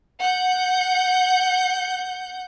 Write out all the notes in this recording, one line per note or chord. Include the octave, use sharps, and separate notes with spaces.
F#5 G6